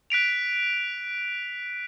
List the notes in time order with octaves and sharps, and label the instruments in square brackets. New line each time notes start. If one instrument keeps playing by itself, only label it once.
[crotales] F#6 B6 D7 F7